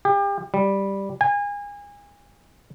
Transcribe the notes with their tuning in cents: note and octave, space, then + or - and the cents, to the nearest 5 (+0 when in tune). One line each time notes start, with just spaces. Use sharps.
G4 +35
G3 +0
G#5 -30